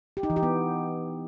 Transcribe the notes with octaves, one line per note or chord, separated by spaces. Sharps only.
G4
D#4
E3
G4
B3